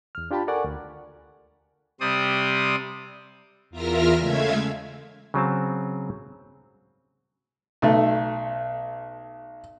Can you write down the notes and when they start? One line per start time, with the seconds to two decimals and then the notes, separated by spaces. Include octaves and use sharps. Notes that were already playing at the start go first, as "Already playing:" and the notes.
0.15 E2 F6
0.31 D4 F4 G4 G5 A5 B5
0.47 A4 A#4 D5 F#5 G#5 C#6
0.64 D2
2.00 C3 G3 C5 D5 D#6
3.70 E2 F4 A#4 E5 F6 A#6
4.18 C#3 G#3 A3 E5 F5 G#6
5.34 C#3 F#3 C4 A5
7.82 B1 A3